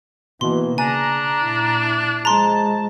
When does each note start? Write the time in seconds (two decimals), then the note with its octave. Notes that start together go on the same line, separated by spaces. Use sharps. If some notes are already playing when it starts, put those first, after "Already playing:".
0.41 B2 E3 A#3 C6
0.78 C#3 D4 G#5 A#5
1.43 A#2 E4
2.25 F3 G#3 A5 A#5 C6